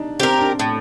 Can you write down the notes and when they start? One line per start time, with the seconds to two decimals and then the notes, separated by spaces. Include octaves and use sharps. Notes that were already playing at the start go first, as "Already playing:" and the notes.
Already playing: D4 D#4
0.20 C4 G4 A#4
0.39 D4
0.59 A2